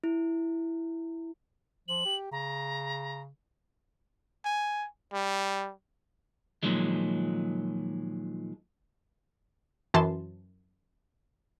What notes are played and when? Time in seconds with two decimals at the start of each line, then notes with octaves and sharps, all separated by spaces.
0.04 E4
1.88 F3 F#7
2.05 G4
2.32 C#3 A#5
4.45 G#5
5.13 G3
6.63 A#2 D#3 F3 F#3 G#3
9.94 F#2 E3 A5 C6